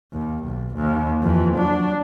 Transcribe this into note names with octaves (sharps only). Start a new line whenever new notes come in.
D#2
B1
D#2
F2 E3
F#3 D4